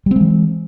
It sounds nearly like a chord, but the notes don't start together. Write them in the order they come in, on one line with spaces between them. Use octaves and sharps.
G3 C4 G#3 E3